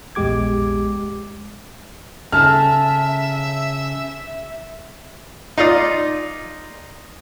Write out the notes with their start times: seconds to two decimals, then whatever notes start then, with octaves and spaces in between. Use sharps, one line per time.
0.15 A#1 E2 G#3 G4 D6 G#6
2.32 C#3 A4 E5 A5 A#5 F6
5.58 D#4 F4 D5 D#6